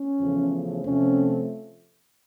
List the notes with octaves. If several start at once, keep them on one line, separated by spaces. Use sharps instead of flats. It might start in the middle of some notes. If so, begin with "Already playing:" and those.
Already playing: C#4
E2 C#3 F3 A3
C3 F3 A3 C4 C#4